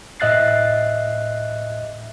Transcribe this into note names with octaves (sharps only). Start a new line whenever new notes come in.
A2 D#5 E5 F#6 A6 C7